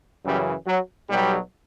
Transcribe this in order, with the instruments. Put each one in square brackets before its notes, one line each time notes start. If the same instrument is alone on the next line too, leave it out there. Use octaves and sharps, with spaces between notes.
[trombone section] F#2 C#3 E3 G3
F#3
B1 B2 F#3 G3